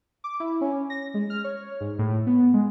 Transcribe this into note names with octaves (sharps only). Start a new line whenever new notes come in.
D6
E4
C#4
A#6
G#3
F6
C#5
G#2
A2
B3
G#3